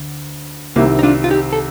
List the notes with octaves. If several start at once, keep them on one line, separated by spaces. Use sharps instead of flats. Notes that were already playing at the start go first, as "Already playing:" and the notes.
Already playing: D2 D3
C2 C3 D#3 A#3
D#4
D4 F4
F4
D#4 G4
A4